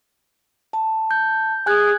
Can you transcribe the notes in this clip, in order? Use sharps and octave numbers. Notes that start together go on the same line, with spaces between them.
A5
G6
G#4 G#5 F#6 G#6